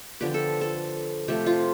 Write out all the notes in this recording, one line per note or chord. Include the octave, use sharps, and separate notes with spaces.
D3 F3 B3 G4
A4
A4
C3 F3 A3 G4
F4